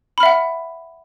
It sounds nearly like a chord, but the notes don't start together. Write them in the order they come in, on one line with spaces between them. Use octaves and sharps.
B5 F6 E5 F#5